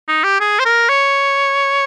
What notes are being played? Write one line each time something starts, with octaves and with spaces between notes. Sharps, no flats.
D#4
G4
G#4
C5
A#4
C#5